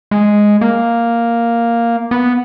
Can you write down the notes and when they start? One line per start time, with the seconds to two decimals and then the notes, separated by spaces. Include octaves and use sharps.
0.11 G#3
0.61 A#3
2.11 B3